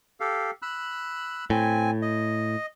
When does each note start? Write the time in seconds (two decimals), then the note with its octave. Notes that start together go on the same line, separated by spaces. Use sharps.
0.20 G4 A4 F5
0.62 B5 E6 F#6
1.50 A2 C4 G#5
2.02 D#5